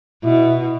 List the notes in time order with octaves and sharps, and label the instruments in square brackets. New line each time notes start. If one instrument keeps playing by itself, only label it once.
[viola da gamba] B2 [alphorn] E4